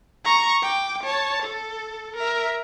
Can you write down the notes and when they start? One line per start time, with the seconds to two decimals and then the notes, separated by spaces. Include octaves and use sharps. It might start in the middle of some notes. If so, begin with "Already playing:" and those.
0.25 A#5 C#6
0.63 G5 D6
1.04 C#5 A5
1.43 A4
2.16 A#4 E5